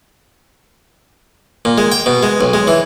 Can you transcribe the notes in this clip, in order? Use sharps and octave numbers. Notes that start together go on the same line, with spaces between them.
A#2
G#3
G5
B2
G#3
B1
G#3
E3